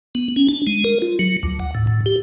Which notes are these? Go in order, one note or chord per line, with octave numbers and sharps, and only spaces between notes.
B3
C#4
D4
G#3
A#4
F4
F#3
D2
F#5
A2
A2
G4